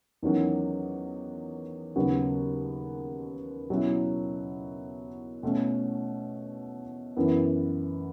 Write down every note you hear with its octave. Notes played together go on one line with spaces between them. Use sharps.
E2 D#3 F#3 C#4 F#4
D#2 C#3 F#3 B3 F#4
B2 F#3 C#4 E4
B2 A3 C#4
F#2 E3 B3